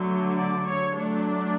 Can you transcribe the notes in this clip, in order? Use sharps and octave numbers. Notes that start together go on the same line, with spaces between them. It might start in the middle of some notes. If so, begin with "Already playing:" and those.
Already playing: D3 F#3 A3
D5
C#5
F#3 A3 D4